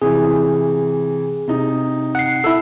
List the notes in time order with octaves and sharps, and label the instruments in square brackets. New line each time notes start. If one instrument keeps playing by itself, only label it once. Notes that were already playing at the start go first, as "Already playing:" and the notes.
[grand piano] C3 E3 [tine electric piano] G#4
[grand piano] C3 D#4
[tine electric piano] F#5 C7
[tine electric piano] E4 A4 [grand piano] E6